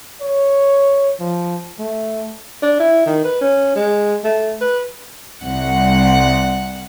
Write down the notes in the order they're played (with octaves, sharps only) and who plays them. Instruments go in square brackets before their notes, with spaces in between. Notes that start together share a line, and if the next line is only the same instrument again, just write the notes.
[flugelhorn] C#5
F3
A3
[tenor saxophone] D4
E4
D#3
B4
C#4
G#3
A3
B4
[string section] C2 F#5